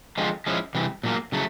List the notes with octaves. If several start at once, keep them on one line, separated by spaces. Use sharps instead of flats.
D3 F3 G#3 C4 F4
F3 G#3 C#4 E4
C3 E3 G3
A#2 F#3 A#3
C#3 F#3 A3